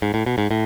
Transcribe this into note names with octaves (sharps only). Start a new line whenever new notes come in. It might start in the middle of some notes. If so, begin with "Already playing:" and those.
G#2
A2
B2
G#2
A2